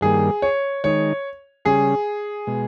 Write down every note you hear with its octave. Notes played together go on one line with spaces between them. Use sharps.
G2 D#3 G3 A#3 G#4
C#5
D#3 G#3 D#4 C#5
C#3 G3 C#4 G#4
B2 G#3